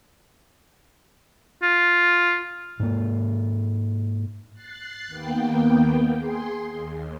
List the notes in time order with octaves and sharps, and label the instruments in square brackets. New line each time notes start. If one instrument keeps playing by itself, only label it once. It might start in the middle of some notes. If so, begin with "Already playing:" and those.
[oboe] F4
[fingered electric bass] G#2 A#3
[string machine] F#6 A6 C7
D#2 A#3 B3 G5
G#4 C6
D#2